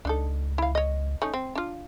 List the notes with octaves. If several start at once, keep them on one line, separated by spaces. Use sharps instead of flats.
C#2 D4 D#4 A4
E4 F5
C#5 D#5
A3 C#4 D#4
C4
D4 F4